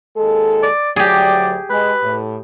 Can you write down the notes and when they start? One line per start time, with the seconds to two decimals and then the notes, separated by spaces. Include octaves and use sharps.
0.17 D#2 G#3 A4
0.63 D5
0.96 D2 F#3 G4 G#4 D5
1.70 G#3 B4
2.03 A2